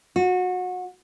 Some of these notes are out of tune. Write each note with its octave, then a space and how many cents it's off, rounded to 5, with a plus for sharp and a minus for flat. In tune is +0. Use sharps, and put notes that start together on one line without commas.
F#4 -25